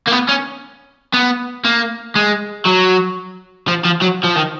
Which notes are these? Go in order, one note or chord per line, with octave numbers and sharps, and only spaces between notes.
A#3
B3
C#4
B3
A#3
G#3
F#3
F3
F3
F#3
F3
D#3